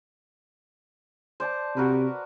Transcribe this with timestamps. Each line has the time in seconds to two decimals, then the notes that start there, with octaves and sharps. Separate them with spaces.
1.40 C5 D5 A5
1.77 C3 F#4 A#4 B4